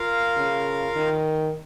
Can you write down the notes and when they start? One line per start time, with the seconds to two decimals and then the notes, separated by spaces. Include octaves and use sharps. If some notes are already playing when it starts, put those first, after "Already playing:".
Already playing: F4 A#4 F5
0.37 C#3
0.96 D#3